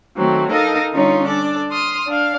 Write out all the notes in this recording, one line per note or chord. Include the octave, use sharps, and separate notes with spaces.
D#3 F#3 A3 C4
D#4 A4 A#4 D#5 F5
D3 G3 C#4 D#4 F4 C#5
D4 A4 D5
C6 D#6 F6
D4 F5